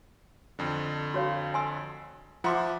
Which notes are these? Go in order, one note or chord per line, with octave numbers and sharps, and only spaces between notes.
F2 D3
F#4 C#5 F5
G#5 C6 E6
F3 F4 E5 F#5 C6 D6